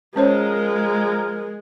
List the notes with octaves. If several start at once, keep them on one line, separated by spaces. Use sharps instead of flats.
F3 G#3 C#4 A#4 C5 C#5